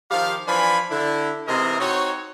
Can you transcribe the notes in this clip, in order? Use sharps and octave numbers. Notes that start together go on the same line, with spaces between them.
D#3 F3 G4 F5
E3 F3 D4 G#5 B5
D3 E4
G#2 C3 E3 A#4 D#5
C4 D#4 F#4 C#5